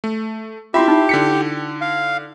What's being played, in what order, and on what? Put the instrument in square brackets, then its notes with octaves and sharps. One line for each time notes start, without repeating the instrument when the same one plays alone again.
[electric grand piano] A3
[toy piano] E4 F4 [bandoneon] G4 [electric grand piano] E5 B5 C6
[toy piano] D#4
[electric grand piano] D3 B6 C#7
[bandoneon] F5